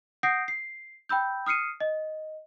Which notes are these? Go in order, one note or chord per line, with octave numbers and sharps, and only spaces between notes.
F#5 D#6 G6 A#6 C7 D7
C7
G5 B5 E6 G6
D#6 F6 C7 C#7 D#7
D#5